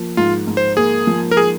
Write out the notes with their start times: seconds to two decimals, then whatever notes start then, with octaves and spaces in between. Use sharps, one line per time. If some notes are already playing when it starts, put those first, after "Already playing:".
Already playing: F3 A#3
0.17 G#2 F4
0.47 G#2
0.57 C5
0.77 A#3 G#4
1.07 F3
1.31 A#4
1.37 G#4